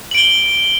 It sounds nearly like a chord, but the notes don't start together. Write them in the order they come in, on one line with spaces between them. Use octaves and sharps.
F#7 D7 G7